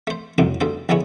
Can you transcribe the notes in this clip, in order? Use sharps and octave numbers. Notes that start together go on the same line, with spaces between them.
A3 C5
C2 F2 A2 C3 F#3 C4
D2 G2 A4 C5
A#1 D3 G#3 B3 E4 C#5